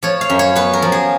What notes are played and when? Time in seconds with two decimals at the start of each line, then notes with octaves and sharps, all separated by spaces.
0.03 F3 C#5
0.21 F5
0.30 F#2
0.39 C#5
0.56 B3 B4
0.73 A#4
0.82 F3
0.92 G#4